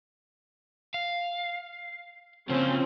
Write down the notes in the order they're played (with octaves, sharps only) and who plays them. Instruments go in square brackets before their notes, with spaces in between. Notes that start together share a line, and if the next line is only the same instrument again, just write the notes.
[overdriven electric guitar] F5
[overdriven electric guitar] C#3 A#3 [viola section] F3 C4 C#4